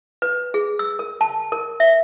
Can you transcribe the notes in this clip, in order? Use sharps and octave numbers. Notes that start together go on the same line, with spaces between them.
B4
G#4
E6
A#4
A5
A#4
E5